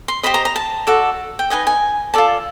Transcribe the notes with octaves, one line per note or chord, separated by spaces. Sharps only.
C6
G4 C5 D#5 B5
A#5
A#5
A5
F#4 A4 D5
G5
D#4 F#4 B4 D#5 G#5
G#5
F4 A4 D5 A5